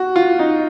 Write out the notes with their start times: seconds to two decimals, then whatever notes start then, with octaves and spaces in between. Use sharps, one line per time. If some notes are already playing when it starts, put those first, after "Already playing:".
Already playing: F#4
0.16 F4
0.39 D#4